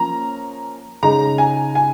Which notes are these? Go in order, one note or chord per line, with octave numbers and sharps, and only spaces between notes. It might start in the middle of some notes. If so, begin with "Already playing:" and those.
Already playing: F3 A#3 C#4 A#5
C#3 G#3 D#4 A#5
G#5
G#5